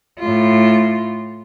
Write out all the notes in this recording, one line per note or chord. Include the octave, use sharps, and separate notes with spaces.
A2 F4